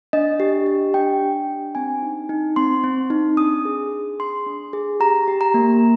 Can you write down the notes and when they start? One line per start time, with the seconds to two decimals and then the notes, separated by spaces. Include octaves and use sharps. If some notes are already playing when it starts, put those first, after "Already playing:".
0.13 D4 D#5
0.40 G4
0.66 G4
0.94 D4 G5
1.22 D4
1.48 D4
1.75 C4 G#5
2.03 D#4
2.29 D#4
2.56 C4 C6
2.84 C4
3.10 D#4
3.37 D4 D#6
3.65 G#4
3.93 G#4
4.19 G#4 C6
4.46 D4
4.73 G#4
5.00 G4 A#5
5.28 G4
5.41 A#5
5.54 A#3